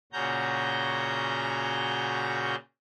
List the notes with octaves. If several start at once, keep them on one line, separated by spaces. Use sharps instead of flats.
A#2 C#3 C#4 F#4 A#5 G6